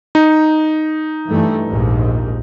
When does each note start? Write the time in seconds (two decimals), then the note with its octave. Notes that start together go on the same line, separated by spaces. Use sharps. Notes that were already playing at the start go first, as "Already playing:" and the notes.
0.15 D#4
1.29 G2 E3 A3
1.66 A#1 D#2 G#2